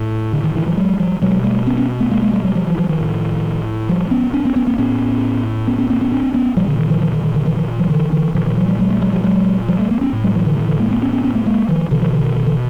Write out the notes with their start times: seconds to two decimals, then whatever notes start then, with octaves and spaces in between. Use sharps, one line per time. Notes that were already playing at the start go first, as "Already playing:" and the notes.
Already playing: A2
0.33 D3
0.44 D#3
0.55 D3 E3
0.66 E3 F#3
0.77 F#3 G#3
1.00 F3 G3
1.22 B2 F#3 G#3
1.44 G3 A3
1.66 B3 C#4
1.77 B3 C#4
2.00 A3 B3
2.11 G#3 A#3
2.22 G#3 A#3
2.34 G3 A3
2.44 F#3 G#3
2.55 F3 G3
2.67 E3 F#3
2.78 E3 F#3
2.89 D#3 F3
3.00 A2
3.89 F3 G3
4.11 B3 C#4
4.33 C4 D4
4.45 B3 C#4
4.56 B3 C#4
4.67 A#3 C4
4.78 A2 B3 C#4
5.67 B3 C#4
5.78 B3 C#4
5.90 A#3 C4
6.01 B3 C#4
6.12 C4 D4
6.34 B3 C#4
6.57 A#2 F3 G3
6.67 D3
6.79 D#3
6.90 D#3 F3
7.01 D#3 F3
7.13 D#3
7.23 D#3
7.34 D3 E3
7.45 D#3 F3
7.57 D#3 F3
7.79 E3 F#3
7.90 D3 E3
8.12 D3 E3
8.35 A#2 D#3 F3
8.46 D#3 F3
8.57 E3 F#3
8.68 F3 G3
8.79 F#3 G#3
8.90 G3 A3
9.02 F#3 G#3
9.13 F3 G3
9.24 F#3 G#3
9.68 F3 G3
9.79 G3 A3
9.91 A3 B3
10.01 B3 C#4
10.13 A2
10.24 F#3 G#3
10.35 E3 F#3
10.46 D3 E3
10.57 D#3
10.68 D3 E3
10.80 G#3 A#3
10.91 A3 B3
11.02 B3 C#4
11.13 B3 C#4
11.24 B3 C#4
11.35 A3 B3
11.46 G#3 A#3
11.68 D#3 F3
11.91 B2 D3 E3
12.02 D#3 F3
12.13 D3 E3
12.24 D#3
12.36 D#3
12.46 D3 E3